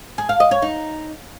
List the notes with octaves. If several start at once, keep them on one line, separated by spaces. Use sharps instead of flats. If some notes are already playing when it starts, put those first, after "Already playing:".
G#4
F5
D#5
C#5
D#4